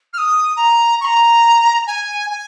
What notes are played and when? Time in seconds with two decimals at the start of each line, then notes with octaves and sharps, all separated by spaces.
0.13 F6
0.18 D#6
0.57 A#5
1.01 C#6
1.05 A#5
1.87 G#5
2.30 G#5